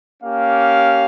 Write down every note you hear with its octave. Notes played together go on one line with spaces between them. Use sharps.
A#3 C#4 G4 F5